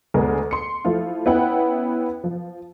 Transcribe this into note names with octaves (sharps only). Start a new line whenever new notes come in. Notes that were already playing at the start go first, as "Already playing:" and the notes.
D2 G#3 B3 A#4
C6 C#7
F3 A3 E4 F4
B3 C#4 E4 B4 F#5 G5
F3